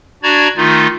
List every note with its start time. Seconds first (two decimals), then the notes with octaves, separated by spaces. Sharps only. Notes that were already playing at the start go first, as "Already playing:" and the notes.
0.23 D4 F#4 D5 A#5 G#6
0.57 D#3 A3 D#4 F4